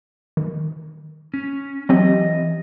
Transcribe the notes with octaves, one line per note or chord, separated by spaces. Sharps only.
D#3
C#4
E3 F#3 C4 G4 D#5